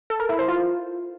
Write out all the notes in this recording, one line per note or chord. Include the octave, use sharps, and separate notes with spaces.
A4
A#4
E4
C5
F4